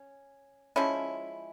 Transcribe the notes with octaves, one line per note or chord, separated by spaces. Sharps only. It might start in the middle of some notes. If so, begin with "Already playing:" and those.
Already playing: C#4
F3 G#3 C#4 E4